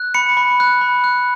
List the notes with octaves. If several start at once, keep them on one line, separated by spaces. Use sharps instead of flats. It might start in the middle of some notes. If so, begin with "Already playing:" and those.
Already playing: F#6
B5 C#7
B5
F#6
B5
F#6